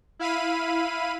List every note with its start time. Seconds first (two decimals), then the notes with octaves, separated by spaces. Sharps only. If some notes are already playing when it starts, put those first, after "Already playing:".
0.19 E4 F5 B5 D#7